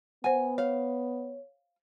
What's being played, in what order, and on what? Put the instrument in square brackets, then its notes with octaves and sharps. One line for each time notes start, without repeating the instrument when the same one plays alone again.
[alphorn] B3 [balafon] C5 F#5 [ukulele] G#5
[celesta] C#5 [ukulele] F5